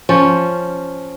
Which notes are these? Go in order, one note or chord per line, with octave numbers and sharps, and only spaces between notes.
F3 C#4